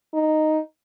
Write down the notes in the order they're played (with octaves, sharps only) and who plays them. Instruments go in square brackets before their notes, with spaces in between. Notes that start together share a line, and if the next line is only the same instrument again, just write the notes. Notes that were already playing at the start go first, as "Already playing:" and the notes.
[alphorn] D#4